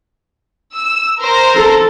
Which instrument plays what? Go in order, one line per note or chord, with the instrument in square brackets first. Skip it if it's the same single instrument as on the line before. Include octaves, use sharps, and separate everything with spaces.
[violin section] E6
A#4 C5 A#5
[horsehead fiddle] A4